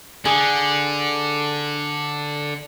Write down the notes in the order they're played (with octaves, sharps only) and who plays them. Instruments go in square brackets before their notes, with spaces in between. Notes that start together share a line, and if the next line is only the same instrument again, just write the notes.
[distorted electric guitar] D3 [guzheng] G#4